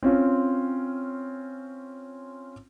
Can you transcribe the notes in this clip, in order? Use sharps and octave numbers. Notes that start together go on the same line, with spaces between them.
C4 C#4 F4